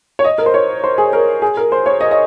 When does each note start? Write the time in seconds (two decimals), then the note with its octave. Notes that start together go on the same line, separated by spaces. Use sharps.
0.19 C#5
0.24 D#5
0.38 A#4
0.46 C5
0.54 C#5
0.84 C5
0.98 G#4
1.13 A#4
1.42 G#4
1.57 A#4
1.72 C5
1.86 C#5
2.01 D#5
2.11 D#5